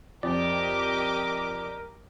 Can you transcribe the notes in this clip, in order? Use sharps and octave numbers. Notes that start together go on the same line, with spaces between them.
F2 G4 A#4 D5 D#5 D6